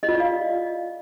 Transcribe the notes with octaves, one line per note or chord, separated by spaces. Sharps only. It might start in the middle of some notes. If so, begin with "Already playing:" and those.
D#5
F4
D5
F5